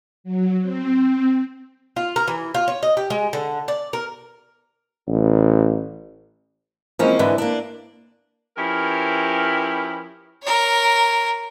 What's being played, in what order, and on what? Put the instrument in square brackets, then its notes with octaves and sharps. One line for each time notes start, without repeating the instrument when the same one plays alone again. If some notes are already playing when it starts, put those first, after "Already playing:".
[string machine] F#3
C4
[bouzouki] F4
A#4
E3
F4
C#5
D#5
G4
G#3
D3
D5
A#4
[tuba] A1
[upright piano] E3 G#3 C4 [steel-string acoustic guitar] F3 A#3 C#4
[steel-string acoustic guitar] G#2 D3 E3 [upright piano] B4
[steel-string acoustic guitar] A#3 D4
[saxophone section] F3 C#4 E4 G4 A#4 B4
[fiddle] A#4 C#5